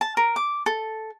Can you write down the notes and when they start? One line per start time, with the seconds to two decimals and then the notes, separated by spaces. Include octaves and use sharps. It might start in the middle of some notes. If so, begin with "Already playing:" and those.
0.01 A5
0.17 A#4
0.36 D6
0.66 A4